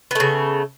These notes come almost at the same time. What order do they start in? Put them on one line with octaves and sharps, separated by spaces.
B3 A3 C#3